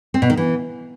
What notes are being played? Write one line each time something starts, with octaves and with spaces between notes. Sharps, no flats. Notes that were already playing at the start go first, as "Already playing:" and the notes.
C4
B2
D#3
E3